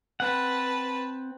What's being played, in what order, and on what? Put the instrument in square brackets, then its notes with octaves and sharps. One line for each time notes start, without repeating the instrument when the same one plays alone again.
[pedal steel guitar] C4 F#5 [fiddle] B4 A5